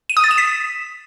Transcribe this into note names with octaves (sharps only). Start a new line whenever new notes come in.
D#7
D#6
A6
E7
B6